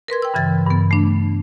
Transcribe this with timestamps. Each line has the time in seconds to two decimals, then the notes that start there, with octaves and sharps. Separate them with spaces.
0.08 A#4 B4 C6 G#6
0.22 G5 E6
0.34 G2 C#3 E3 A6
0.66 G2 B3
0.91 A3 D4